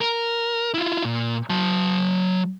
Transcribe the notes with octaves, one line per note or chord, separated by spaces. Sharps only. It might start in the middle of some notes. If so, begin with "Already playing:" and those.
A#4
E4 F4
A#2
F#3 A5